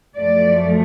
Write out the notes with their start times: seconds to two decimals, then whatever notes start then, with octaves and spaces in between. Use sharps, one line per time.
0.16 F#2 F3 A3 D5